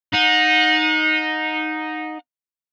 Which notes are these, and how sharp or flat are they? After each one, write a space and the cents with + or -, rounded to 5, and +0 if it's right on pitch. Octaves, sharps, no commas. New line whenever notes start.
D#4 +0 F#5 -35